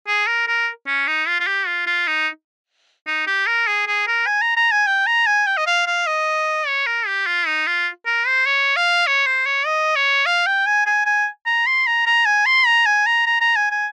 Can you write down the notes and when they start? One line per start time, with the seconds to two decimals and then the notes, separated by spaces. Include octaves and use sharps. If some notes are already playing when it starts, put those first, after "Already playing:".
0.07 G#4
0.27 A#4
0.48 A#4
0.87 C#4
1.07 D#4
1.27 F4
1.40 F4
1.47 G4
1.67 F4
1.87 F4
2.07 D#4
3.07 D#4
3.27 G4
3.47 A#4
3.67 G#4
3.87 G#4
4.07 A#4
4.27 G#5
4.42 A#5
4.56 A#5
4.72 G#5
4.87 G5
5.07 A#5
5.27 G#5
5.47 G5
5.57 D#5
5.67 F5
5.86 F5
6.07 D#5
6.67 C#5
6.87 A#4
7.06 G4
7.27 F4
7.46 D#4
7.67 F4
8.06 A#4
8.27 C5
8.46 C#5
8.76 F5
9.07 C#5
9.26 C5
9.46 C#5
9.66 D#5
9.96 C#5
10.26 F5
10.47 G5
10.66 G#5
10.86 G#5
11.06 G#5
11.46 A#5
11.66 C6
11.86 A#5
12.06 A#5
12.26 G#5
12.46 C6
12.66 A#5
12.86 G#5
13.06 A#5
13.26 A#5
13.41 A#5
13.56 G#5
13.71 G#5